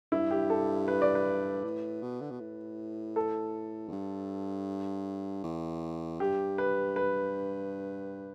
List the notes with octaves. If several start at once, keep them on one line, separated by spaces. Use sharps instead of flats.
G2 E4
G4
A4
B4
D5
B4
A2
B2
D3
B2
A2
A4
E2
G2
E2
G2 G4
B4
B4